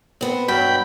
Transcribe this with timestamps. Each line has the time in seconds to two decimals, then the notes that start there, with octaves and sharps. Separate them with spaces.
0.21 B3 C4
0.48 G2 B2 F#3 G5 B5